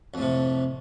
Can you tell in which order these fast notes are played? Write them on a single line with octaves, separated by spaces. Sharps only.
F2 A2 C3